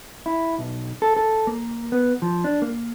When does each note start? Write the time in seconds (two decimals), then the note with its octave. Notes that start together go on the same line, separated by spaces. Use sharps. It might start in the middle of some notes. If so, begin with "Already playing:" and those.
0.26 E4
0.58 B1
1.02 A4
1.16 A4
1.47 A#3
1.92 B3
2.22 F3
2.44 D4
2.62 A#3